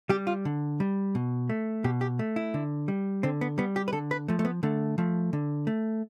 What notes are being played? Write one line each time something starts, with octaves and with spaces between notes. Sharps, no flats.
G3 G4
F4
D3
G3
B2
A3
B2 G4
G4
A3
E4
D3
G3
D3 C4
B3
G3 B3
G4
B4
D3 A4
B4
F3 A3
A3
B3
D3 A3
F3 A3
D3
A3